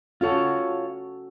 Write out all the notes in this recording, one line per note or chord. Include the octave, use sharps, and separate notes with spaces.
C#4 F4 F#4 A4 C#5